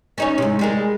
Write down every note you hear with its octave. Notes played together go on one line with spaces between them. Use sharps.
C#4 D#4 C#5
G#2 C3
G3 G#3 A#4